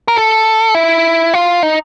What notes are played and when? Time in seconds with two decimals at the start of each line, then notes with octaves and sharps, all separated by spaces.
0.08 A#4
0.16 A4
0.74 E4
1.34 F4
1.63 D#4